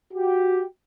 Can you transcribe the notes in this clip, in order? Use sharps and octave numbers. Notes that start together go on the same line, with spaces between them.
F#4 G4